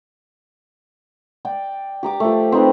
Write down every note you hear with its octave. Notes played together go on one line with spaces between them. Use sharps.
D5 G5 D6
G4 A#5 D6
F3 A3
C4 D#4 B4